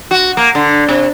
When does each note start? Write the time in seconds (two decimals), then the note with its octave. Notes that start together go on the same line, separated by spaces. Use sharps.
0.11 F#4
0.37 A#3
0.55 D3
0.89 C3